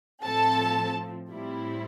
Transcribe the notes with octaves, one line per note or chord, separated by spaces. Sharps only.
A2 F3 C4 A4 A5
A2 G3 C4 E4